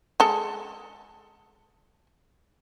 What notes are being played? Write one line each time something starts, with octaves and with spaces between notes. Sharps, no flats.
G#3 A4